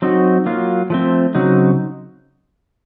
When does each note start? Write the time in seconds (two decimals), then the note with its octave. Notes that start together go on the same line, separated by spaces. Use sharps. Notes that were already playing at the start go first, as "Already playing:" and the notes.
0.02 F#3 C4 D#4 F#4
0.46 F#3 A#3 F4
0.90 F3 A3 C4
1.35 C#3 F#3 C4 D#4 F#4